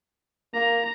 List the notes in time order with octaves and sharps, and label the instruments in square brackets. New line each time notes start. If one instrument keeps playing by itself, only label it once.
[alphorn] A#3 [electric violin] A#5